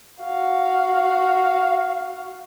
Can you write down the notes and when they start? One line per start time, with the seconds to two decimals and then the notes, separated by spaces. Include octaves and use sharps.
0.21 F#4 F5